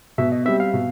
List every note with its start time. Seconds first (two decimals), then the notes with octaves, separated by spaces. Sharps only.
0.18 B2 E5
0.32 D#5
0.45 G3 C4 E5
0.60 F5
0.74 B2